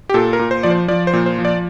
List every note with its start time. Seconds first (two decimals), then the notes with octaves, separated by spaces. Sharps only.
0.09 G4
0.14 A#2 A4
0.33 A#4
0.39 A#2
0.51 C5
0.63 F3 D5
0.70 C5
0.88 F3 D5
1.07 C5
1.13 A#2
1.26 C5
1.38 F3
1.45 D5